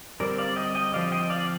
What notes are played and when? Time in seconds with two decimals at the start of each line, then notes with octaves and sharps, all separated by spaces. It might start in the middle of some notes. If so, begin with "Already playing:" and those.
0.20 D3 G3 C4 A#4 D5
0.38 D5 F5
0.56 D#5 G5
0.75 D#5 G5
0.93 D3 F3 C4 D5 F5
1.12 D#5 G5
1.30 D5 F5